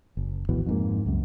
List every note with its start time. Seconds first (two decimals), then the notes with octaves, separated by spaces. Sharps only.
0.17 F#1
0.49 D1 G#1 B2 E3
0.66 F2 G#2 A#3
1.06 C#2 F#2